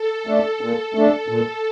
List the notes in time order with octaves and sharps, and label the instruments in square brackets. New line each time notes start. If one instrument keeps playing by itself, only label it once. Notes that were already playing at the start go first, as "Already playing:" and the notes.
Already playing: [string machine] A4
[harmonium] A3 D4
A#2
[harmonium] A3 D4 [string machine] A4
[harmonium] A#2 [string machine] A4